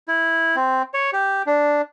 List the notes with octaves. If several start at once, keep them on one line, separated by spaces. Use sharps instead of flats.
E4
C4
C#5
G4
D4